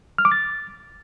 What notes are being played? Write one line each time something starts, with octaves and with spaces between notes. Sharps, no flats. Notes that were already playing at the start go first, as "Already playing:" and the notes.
F6
D6
A6